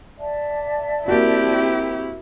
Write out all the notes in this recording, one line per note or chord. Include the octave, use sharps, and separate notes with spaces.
D5 E5 A5
A#3 C4 E4 F#4 G4